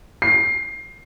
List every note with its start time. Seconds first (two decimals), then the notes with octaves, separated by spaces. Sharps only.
0.22 C7